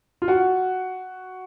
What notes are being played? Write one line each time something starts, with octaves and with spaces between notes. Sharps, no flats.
F4
F#4